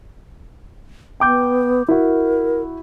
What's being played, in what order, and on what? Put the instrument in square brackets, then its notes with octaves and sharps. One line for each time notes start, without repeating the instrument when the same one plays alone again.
[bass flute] B3 [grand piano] G5 D6 G6
[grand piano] E4 F#4 [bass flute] A#4